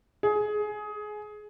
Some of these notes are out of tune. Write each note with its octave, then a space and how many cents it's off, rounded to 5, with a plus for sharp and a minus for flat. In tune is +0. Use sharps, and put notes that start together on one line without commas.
G#4 +20